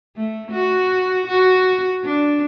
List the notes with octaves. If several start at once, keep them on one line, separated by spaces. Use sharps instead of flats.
A3
F#4
F#4
D4